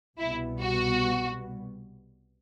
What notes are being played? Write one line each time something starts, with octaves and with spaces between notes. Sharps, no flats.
C2 B2 G3 B3 E4
F#4